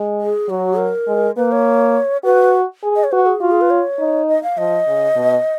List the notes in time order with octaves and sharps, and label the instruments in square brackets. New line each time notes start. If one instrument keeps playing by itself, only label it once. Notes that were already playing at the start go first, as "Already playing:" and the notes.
Already playing: [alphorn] G#3
[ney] G#4
[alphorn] F#3 [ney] F#4
[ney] A#4
[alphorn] G#3
[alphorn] A#3 [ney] B4
[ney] C#5
[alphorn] F#4 [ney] B4
[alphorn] G#4
[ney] D#5
C#5
[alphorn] F#4 [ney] B4
[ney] G#4
[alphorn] F4 [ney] F#4
[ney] G#4
B4
C#5
[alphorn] D#4
[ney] D#5
F5
[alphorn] F3 [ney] D#5
[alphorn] C#3
B2